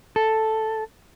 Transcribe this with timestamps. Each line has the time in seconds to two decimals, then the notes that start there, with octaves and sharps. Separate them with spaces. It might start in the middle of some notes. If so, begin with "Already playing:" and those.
0.16 A4